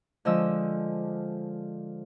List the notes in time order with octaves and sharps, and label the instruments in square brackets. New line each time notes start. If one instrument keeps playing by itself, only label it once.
[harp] D3 F3 G#3 D#5 E6